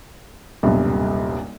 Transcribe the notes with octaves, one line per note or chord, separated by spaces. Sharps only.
D#1 B1 G2 C3